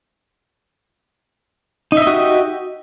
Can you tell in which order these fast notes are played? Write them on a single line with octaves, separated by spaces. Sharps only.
D#4 E5 D#5 F#4 G4